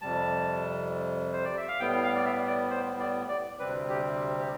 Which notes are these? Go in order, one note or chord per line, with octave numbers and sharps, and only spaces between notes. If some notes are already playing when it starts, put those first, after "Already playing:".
F2 C3 G3 A5
C5
D5
E5
F5
A2 G3 B3 G5
F5
D5
E5
D5
C5
D5
D5
D2 C3 G3 C4 B4
G4
G4